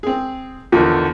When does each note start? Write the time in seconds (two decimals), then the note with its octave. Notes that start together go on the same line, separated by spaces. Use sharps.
0.03 C4 G#4
0.72 E2 D3 D#3 F3